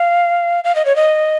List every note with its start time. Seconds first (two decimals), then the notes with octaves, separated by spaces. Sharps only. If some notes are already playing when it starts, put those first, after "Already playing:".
Already playing: F5
0.64 F5
0.75 D#5
0.85 C#5
0.96 D#5